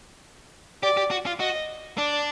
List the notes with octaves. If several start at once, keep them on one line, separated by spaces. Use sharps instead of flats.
G4 D5
G4
F#4
F4
F#4 D#5
D4 D5